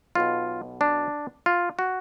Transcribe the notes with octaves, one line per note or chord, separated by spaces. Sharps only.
B1 B2 F4
D4
F4
F#4